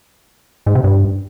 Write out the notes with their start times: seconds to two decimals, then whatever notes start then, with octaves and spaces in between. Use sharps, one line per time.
0.66 G#2
0.75 C3
0.84 G2